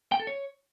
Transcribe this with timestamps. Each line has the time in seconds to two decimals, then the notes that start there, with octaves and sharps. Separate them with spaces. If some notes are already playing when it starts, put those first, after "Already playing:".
0.12 G5
0.20 A4
0.27 C#5